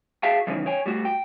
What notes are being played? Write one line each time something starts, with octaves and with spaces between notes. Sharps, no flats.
F#4 G#4 E5 F5 G5 A5
C#3 E3 F3 G3 C#4 D#4
C#5 G5 G#5
G3 A3 F#4
G5